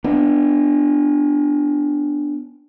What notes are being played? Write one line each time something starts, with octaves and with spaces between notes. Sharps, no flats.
B3 D4